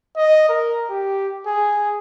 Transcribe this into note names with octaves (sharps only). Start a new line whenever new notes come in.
D#5
A#4
G4
G#4